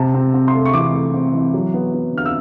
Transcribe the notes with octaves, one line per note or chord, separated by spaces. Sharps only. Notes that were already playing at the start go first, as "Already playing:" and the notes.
Already playing: C3 A5
C4
C4
C6
A3
C#6
E3 D6
A3
C4
E3
F#3
B3
B3
D3 F6
E6